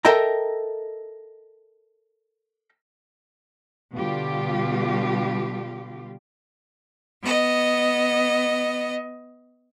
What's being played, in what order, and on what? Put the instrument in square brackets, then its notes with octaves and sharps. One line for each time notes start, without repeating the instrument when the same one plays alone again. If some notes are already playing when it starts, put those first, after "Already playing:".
[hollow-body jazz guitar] A4 A#4 D#5 E5 G5 A#5
[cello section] B2 D3 G3 F4 G4
[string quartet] B3 D#5